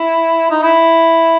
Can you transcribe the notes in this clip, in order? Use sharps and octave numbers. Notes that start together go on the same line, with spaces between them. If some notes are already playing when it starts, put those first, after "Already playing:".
Already playing: E4
D#4
E4